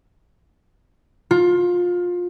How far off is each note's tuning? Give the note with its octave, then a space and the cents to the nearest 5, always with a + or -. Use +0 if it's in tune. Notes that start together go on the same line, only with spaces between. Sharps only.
F4 +20